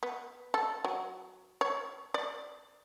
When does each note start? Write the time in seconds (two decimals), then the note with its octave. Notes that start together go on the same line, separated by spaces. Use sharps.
0.03 B3
0.54 A4
0.85 F#3
1.61 C#5
2.14 D5